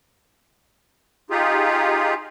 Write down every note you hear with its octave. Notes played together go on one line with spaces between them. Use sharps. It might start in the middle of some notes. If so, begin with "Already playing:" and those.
D#4 F4 G4 G#4